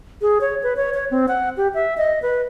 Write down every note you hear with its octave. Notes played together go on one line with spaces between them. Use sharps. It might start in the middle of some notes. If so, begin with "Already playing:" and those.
G#4
C#5
B4
C#5
C#5
C4
F#5
G4
E5
D#5
B4